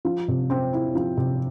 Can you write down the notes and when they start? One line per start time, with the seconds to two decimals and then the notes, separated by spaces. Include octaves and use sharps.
0.05 F3
0.28 C3
0.50 C4
0.73 E4
0.95 F3
1.17 C3